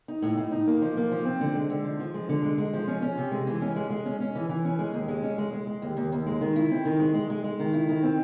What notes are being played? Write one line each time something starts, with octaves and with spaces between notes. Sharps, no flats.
D#4
A2
A2
D#4
A#3
F3
A#3
F3
C4
D3
G#3
D3
F3
F3
G#3
D3
G#3
G#3
F3
C#4
C#4
C3
G#3
E3
C#4
G#3
G#3
C#4
C#4
E3
E3
C#4
G#3
D#2
G#3
C#4
G#3
G#3
G#3
D#2
D#2
D#2
G#3
D#3
E4
C4
D#3
G#3
G#3
G#3
G#3
D#3
E4
D#3
C4